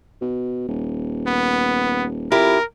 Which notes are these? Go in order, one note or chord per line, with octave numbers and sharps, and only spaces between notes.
B2
D#1
B3
F2 E4 G4 A#4